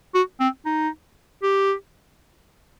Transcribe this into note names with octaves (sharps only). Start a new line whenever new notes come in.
F#4
C4
D#4
G4